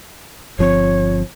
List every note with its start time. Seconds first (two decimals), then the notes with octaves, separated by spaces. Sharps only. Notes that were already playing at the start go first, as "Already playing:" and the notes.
0.59 G1 F3 C4 C#5